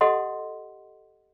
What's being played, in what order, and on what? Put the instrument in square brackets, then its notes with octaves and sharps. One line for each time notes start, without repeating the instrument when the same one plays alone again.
[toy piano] G4 A4 D#5 F#5 C6